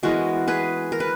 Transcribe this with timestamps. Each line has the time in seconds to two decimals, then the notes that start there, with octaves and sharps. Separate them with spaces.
0.03 E3 G#3 B3 F#4 A#4
0.48 G#4 B4
0.92 A#4
1.00 B4